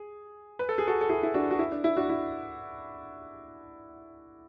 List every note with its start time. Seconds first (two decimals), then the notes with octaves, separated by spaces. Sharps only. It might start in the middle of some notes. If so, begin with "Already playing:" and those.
Already playing: G#4
0.59 B4
0.69 A4
0.78 G#4
0.87 F#4 A4
1.01 A4
1.09 E4 G#4
1.23 E4
1.34 D4 F#4
1.51 F#4
1.59 E4
1.72 D4
1.84 E4
1.97 D4 F#4
2.09 E4